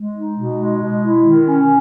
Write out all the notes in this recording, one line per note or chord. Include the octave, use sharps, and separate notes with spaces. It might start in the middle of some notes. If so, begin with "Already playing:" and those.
Already playing: G#3
D#4
B2
G#3
B2
E4
D#3
C#4